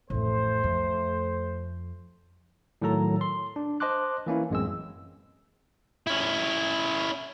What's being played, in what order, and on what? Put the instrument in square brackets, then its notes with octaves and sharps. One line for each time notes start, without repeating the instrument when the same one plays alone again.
[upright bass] A1 F2 [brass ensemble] A3 C5
[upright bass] F2
[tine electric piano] A2 D#3 F#3 A4 A#5
C6
D4
C5 D#5 A5 C6 D6 F#6
E3 A#3 C#4 E4
A1 F#2 G#3 C4 E6
[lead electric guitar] C#4 E4